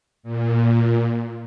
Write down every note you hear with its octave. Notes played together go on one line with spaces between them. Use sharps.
A#2